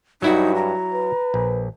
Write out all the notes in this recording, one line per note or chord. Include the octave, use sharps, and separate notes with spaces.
G2 F#3 D#4 E4 F#4
A#5
B4
A#1